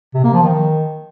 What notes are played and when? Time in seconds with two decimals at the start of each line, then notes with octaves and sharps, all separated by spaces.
0.14 C3
0.24 A#3
0.33 F3
0.43 D#3